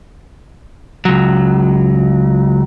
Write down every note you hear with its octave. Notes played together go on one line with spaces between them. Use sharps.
C#2 F#3